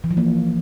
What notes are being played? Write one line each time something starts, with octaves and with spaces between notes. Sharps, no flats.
E3
F3
A#3